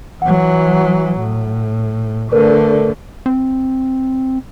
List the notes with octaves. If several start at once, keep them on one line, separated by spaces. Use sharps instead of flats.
E3 F#3 F#5
A2
D3 A3 A#4 B4 D5
C4